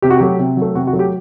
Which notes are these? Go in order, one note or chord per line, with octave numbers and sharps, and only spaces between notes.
C3 G4
F#4
F#3 A3 G4
C3
F#3 A3
C3 F#4
F#4
F#3 A3
G4